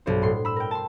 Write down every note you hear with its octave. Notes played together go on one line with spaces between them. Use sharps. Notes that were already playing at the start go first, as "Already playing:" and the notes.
B1 G2 C5
A2 C6 C7
B5 E6
A#4 G5
A5 C6